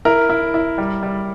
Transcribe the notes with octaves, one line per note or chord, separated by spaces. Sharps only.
E4 A#4
E4
E4
G3
G3